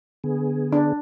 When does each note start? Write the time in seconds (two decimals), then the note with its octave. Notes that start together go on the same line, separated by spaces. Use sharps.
0.24 D3 B3 G#4
0.72 D4